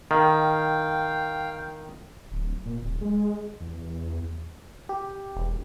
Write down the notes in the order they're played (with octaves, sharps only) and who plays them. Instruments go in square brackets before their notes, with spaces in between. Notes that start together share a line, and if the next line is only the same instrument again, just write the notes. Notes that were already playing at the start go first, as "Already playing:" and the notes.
[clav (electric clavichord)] D#3 [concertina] F5 G5
[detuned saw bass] D1
A#2
D1
G#3
E2
[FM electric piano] G4
[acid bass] E1